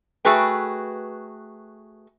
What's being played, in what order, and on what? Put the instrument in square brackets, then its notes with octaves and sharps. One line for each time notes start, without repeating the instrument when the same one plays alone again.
[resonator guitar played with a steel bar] A3 F#4 G#4 B4 G5